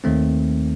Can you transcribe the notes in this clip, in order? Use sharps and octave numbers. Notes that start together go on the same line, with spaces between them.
D#2 D#3 A3 C4